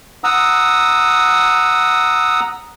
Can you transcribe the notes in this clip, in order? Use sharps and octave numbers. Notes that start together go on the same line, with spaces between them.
F#5 A#5 D#6 E6